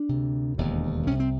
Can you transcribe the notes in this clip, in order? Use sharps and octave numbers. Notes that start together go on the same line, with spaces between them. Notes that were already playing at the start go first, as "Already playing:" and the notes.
Already playing: D4
D2 C3
E1 D#2 D3
C2 C3 C#4
C4